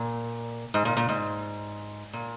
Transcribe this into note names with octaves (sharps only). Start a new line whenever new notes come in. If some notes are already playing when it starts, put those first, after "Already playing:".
Already playing: A#2
G#2
A#2
A#2
G#2
A#2